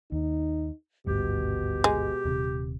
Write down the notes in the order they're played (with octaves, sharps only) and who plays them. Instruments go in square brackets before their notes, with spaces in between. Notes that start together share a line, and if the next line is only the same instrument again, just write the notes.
[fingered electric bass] D#2 [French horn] D#4
[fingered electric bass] G#1 D2 G2 [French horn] B2 [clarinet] G4
[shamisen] G#3
[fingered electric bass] D#1 C3